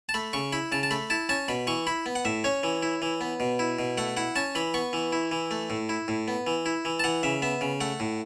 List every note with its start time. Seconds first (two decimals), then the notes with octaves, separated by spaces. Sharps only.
0.09 A5
0.14 A3 B5
0.33 C#3 C#6
0.53 E4 B5
0.72 C#3 A5
0.83 A5
0.91 A3 B5
1.10 E4 A5
1.29 C#4 A5
1.48 B2 B5
1.67 E3 C#6
1.87 E4 B5
2.06 B3
2.15 F#5
2.25 A2 E5
2.44 C#4 C#5
2.63 E3
2.82 E4
3.02 E3
3.21 B3
3.40 B2
3.59 E4
3.79 B2
3.98 A3 F#5
4.17 E4 F#5
4.36 C#4 A5
4.55 E3 B5
4.74 B3 C#6
4.93 E3
5.12 E4
5.31 E3
5.51 A3
5.70 A2
5.89 E4
6.08 A2
6.28 B3
6.47 E3
6.66 E4
6.85 E3
6.99 A5
7.04 E3 F#5
7.23 C#3 E5
7.42 B3 E5
7.61 C#3
7.81 A3 F#5
8.00 A2